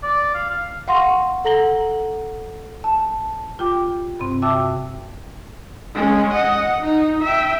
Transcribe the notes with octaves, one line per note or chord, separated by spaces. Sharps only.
D5
F5
F5
F5 F#5 C6 C#6 A#6
A4 F#5 A#5 A#6 F#7 G7
A5
F4 G4 G5 D6
G2 C3 C4
F#4 E5 G5 A5 D6 E6
G#3 C#4
D#5 F#5
D#4
E5 G5